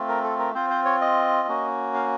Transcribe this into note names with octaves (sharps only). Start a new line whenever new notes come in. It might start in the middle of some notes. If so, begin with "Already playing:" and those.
Already playing: A3 C4 F4
A#4
A4
A#4
C4 F4 C5
C5
C#5
D#5
A#3 C#4 F#4
F5